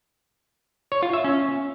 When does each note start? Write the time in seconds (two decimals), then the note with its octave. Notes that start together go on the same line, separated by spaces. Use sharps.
0.92 C#5
1.03 F4
1.13 E5
1.24 C#4